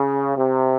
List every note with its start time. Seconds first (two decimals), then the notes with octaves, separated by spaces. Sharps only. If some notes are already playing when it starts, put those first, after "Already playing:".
Already playing: C#3
0.37 C3